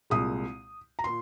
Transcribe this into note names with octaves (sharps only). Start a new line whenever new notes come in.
C2 A#2 G#3 D#6
A#5
A#2 C6